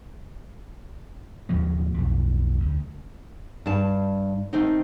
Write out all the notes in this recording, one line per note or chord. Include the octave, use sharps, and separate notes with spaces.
D#2 A2 F3 F#3
B1 F2
D2
G2 A5
D#3 A3 C4 D#4